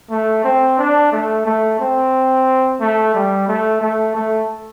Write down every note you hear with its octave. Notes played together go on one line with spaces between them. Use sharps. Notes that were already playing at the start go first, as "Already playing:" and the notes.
A3
C4
D4
A3
A3
C4
A3
G3
A3
A3
A3